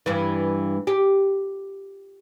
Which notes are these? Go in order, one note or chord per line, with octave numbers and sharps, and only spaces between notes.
G2 E3
G4